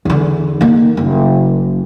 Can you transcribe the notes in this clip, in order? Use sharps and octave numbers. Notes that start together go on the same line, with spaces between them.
E2 D3
D#3 A#3
F#1